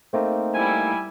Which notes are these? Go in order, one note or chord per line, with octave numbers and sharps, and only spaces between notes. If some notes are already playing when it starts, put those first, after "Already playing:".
A3 A#3 C4 D#4
G3 E4 G#5